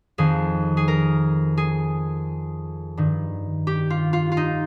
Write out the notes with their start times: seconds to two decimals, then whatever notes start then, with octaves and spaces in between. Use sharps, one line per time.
0.18 F2 D#3 G#4
0.77 G#4
0.88 A#4
1.57 G#4
2.97 G2 D#3
3.67 G4
3.90 F4
4.13 F4
4.32 F4
4.37 D#4